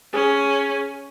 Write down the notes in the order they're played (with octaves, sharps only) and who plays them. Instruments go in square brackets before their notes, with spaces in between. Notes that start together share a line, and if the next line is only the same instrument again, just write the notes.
[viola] C#4 [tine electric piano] G#4